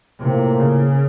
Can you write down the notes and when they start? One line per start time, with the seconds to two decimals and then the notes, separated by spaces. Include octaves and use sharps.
0.21 A2 C3 F3 A#3
0.60 C#3